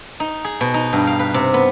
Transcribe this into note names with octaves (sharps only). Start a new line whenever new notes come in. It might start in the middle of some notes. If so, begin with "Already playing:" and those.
D#4
G#4
B2
D#4
G2
F5
B4
C3
B3